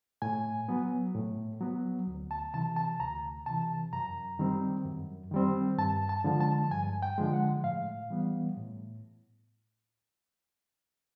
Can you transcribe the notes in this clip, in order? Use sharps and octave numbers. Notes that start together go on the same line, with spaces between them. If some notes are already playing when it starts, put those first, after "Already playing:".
A2 G#5
F#3 B3
A2
F#3 B3
D2
A5
C3 E3 A5
A5
D2 A#5
C3 E3 A5
F#2 A#5
D#3 G3 C4
F#2
D#3 G3 C4
G2 A5
A5
D3 F3 G#3
A5
G2 G#5
G5
D3 F3 G#3
F#5
A2 F5
E3 G3 B3
A2